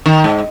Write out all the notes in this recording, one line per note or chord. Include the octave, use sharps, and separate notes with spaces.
D#3
G#2